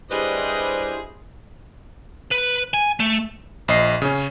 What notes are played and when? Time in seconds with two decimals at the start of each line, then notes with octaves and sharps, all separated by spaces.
0.11 G3 D4 E4 G4 G#4 B4 C5 D#5
2.31 B4
2.74 G#5
3.00 A3
3.68 A#1 D#5 C7
4.02 C#3 C#4